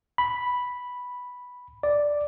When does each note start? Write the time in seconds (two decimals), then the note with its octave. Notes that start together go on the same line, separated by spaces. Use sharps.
0.18 B5
1.83 D5